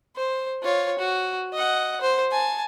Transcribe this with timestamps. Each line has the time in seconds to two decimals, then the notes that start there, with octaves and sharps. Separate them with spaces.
0.16 C5
0.63 F4 C#5
0.98 F#4
1.53 D#5 F#5
2.01 C5
2.31 G#5 A5